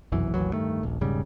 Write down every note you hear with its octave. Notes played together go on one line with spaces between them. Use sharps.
F1 B1 F#2 E3
A1 D#2 E3 F#3
D1 G2 D#3 A3
D#1 A#1
E1 G#2 C#3 G3